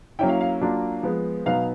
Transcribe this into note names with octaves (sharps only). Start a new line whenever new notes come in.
F#3 A#3 C#4 E4 G5
F5
F5
F#3 A#3 D4 F4
F3 G#3 B3
B2 F#3 B3 D#4 F5